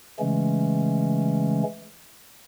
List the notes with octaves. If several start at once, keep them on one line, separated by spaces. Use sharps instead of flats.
C#3 E3 G#3 A3 C#4